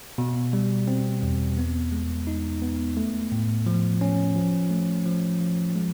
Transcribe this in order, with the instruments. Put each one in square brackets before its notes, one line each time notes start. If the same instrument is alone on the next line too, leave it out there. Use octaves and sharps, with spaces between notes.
[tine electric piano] B2
G3
C4
E2
B3
G#3
D#4
B3
A3
A2
F3
C#4
F3
A3
F3
F3
G#3